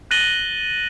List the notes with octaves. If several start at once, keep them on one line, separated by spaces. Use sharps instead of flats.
F#6 A6 A#6 D#7 F#7 G7